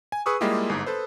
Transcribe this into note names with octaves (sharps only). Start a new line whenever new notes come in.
G#5
G#4 B4 C#6 D#6 E6
G3 G#3 A#3 E4 F4 G4
G1 G#2
A4 B4 C5